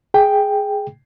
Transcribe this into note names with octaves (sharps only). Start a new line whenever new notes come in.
G#4 G5